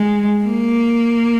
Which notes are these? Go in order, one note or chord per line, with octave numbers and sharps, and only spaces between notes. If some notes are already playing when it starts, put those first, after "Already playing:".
Already playing: G#3
A#3